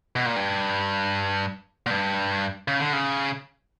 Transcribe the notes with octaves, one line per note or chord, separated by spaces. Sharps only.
B2
A#2
G2
A#2
G2
C#3
D3
C#3